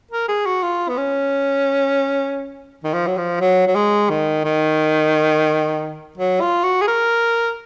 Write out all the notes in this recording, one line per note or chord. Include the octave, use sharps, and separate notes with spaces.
A#4
G#4
F#4
F4
B3
C#4
D#3
F3
F#3
F3
F#3
F#3
G#3
D#3
D#3
F#3
F4
F#4
G#4
A#4